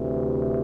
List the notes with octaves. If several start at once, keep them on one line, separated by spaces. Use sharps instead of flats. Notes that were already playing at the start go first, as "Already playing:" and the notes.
Already playing: D2 C3 E3